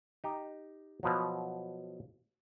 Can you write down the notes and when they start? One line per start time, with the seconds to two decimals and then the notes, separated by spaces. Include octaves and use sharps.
0.24 D#4 G4
1.03 B2 F3 F#3